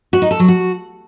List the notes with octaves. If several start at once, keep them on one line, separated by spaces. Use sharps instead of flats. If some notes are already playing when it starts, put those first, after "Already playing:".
F#4
D#4
A4
F#3
F#4